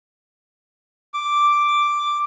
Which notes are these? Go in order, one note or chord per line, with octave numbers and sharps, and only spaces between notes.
D6